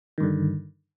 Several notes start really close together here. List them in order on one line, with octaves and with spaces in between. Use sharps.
D#3 G2 D3